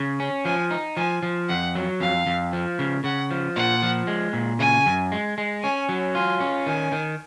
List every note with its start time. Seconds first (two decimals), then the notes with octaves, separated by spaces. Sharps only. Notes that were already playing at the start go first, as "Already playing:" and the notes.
Already playing: C#3
0.20 C#4
0.45 F3 G#5
0.71 D#4
0.97 F3 G#5
1.23 F3
1.49 F2 F#5
1.75 F#3
2.00 F2 F5
2.26 F2
2.53 F3
2.79 C#3
3.04 C#3 F#5
3.30 F3
3.56 A#2 F#5
3.83 F3
4.07 G#3
4.33 A#2
4.59 C#3 G#5
4.86 F#2
5.12 G#3
5.38 G#3
5.63 C#4 G#5
5.89 F#3
6.15 F4 G#5
6.40 C#4
6.67 D#3 G#5
6.92 D#3